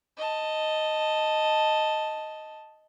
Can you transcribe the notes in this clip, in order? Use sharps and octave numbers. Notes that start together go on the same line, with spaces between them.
D#5 A5